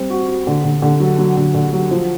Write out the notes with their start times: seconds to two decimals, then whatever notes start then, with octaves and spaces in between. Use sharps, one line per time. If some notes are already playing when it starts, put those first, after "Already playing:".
Already playing: G3 C4
0.10 F#4
0.28 F#4
0.47 D3
0.64 D3
0.82 D3
1.00 F#3
1.18 F#3
1.37 D3
1.54 D3
1.73 F#3
1.91 F3